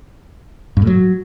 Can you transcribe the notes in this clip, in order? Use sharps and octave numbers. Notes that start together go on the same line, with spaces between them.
G2
A2
F#3